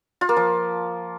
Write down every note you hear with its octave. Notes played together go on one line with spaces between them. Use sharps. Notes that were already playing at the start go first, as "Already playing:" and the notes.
F4
A#3
F3